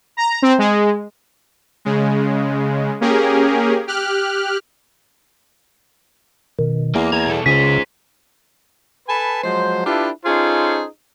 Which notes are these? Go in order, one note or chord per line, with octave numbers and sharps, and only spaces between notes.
A#5
C4
G#3
C#3 G#3
A#3 C#4 G4 G#4 A#4
G4 F6 F#6
B2 D#3
E2 A#3
E2 A#5 G#6
B2 A4
C#2 C#3 G#4 C5 B6
A4 B4 G#5 A5 B5
F3 F#3 G#3 C5
D4 E4 F4 G4 A4 B4
C#4 D#4 F4 G#4 A4 C5